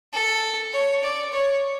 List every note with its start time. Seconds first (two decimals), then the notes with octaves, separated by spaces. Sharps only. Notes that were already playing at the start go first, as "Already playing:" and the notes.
0.13 A4
0.73 C#5
1.03 D5
1.33 C#5